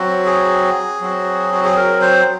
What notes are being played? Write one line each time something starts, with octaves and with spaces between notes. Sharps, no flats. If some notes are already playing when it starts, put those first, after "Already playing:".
Already playing: F#3 C4 F#4
G#4
F#3 C4 F#4
F#4
G#4
A#4
C5